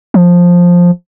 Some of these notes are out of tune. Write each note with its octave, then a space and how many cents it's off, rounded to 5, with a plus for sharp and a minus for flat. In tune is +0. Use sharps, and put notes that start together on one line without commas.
F3 +10